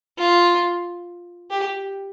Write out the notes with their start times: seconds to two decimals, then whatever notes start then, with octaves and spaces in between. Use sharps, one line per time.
0.18 F4
1.51 G4